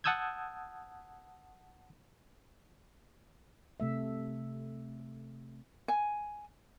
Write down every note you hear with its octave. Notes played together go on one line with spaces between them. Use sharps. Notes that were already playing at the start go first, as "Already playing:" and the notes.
F#5 A5 D#6 E6 G6 G#6
C3 A3 E5
G#5